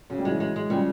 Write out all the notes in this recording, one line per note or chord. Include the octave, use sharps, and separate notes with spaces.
C#3 F#3
G3
E3 F#3 G#3
G#3
G#3
C#3 F3 G3